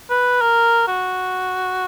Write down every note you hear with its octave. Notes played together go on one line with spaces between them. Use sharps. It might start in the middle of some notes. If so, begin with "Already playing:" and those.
B4
A#4
F#4